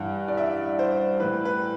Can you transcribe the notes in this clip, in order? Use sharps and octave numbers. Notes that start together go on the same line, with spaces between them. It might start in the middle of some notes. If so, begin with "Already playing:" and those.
Already playing: G2 E3 F#5
D5
E5
C5
A2 E3 B4
B4